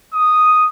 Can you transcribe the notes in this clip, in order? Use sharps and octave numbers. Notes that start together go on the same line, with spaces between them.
D#6